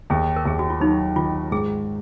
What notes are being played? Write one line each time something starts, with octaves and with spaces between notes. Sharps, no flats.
D#2 G#4
A#4
D#2 G#4
F#4
F4
F#3 D#4
D#3 F4
G#2 G#4